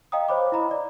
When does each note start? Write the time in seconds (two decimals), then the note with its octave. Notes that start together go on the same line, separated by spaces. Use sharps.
0.12 D#5 F5 G5 A#5 D#6
0.29 C5 C#5 B5 D6
0.52 E4 D#5 A#5 B5
0.71 D5